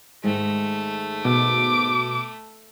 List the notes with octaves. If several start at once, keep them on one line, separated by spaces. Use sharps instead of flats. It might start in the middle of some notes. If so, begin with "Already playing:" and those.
G#2 D#3 G#3 A3
B2 D6